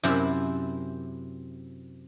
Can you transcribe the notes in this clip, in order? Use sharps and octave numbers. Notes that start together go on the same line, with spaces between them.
F#2 C3 E4 C5 B5